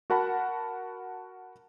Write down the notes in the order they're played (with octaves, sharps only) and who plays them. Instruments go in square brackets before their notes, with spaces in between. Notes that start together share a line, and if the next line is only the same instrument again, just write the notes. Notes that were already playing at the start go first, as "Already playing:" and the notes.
[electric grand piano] F#4 A#4 F#5 A5 B5